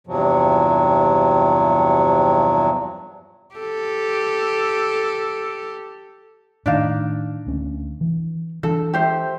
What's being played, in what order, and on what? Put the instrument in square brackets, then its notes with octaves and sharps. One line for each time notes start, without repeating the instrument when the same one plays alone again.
[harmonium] E2 G2 C3 F3 F#3
[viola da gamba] G4 A4
[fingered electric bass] A2 D#3 [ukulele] D4 D#4 F5
[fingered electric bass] D2 C#4
E3
[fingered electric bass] E3 D4 [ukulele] A4
[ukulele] G4 C5 E5